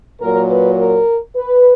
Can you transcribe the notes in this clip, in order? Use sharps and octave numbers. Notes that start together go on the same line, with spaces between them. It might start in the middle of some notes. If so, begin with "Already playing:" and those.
A#2 F#3 A#4
B4
A#4
B4